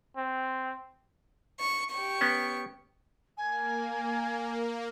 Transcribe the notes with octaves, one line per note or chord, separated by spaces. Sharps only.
C4
C#6
G4 C#6
B3 C#4
A#3 G#5